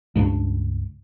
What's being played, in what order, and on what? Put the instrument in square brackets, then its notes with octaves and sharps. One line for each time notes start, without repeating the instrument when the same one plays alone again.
[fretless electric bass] C#2 G2 A3 D4